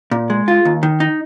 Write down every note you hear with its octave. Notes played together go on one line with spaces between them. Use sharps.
A#2
G#3
F4
D#2
D#3
D#4